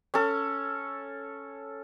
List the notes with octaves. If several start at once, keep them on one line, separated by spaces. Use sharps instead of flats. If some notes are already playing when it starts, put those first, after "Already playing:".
C#4 A4